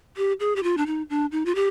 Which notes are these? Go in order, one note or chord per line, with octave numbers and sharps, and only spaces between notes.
G4
G#4
G4
F4
D4
D#4
D4
D#4
F4
G4